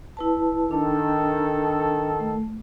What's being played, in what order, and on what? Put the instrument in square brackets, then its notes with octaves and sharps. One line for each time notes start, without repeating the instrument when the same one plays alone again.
[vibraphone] E4 B4 A5
[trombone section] D#3 A4 [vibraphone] D4
[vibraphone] A3